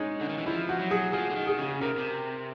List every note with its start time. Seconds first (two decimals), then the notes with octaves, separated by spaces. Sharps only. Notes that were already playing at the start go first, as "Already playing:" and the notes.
Already playing: G#3 C#4 D#4
0.21 D3
0.29 D#3
0.38 E3
0.46 F3 E4
0.69 F#4
0.80 F#3
0.91 G#4
1.13 F3 G#4
1.30 D3
1.36 D#3
1.47 G#4
1.58 C#3
1.81 C3 A#4
1.98 C3